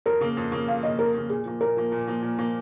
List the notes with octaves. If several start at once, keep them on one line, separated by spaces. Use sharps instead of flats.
F2 A#4
C#3 A#3
F2
C#3 A#3
F2 F5
C#3 A#3 D#5
F2 A#4
C#3 A#3
A#2 G#4
F3 A#3
A#2 A#4
F3 A#3
A#2
F3 A#3
A#2
F3 A#3